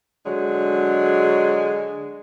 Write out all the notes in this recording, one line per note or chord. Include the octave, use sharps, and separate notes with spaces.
D3 F#3 G#3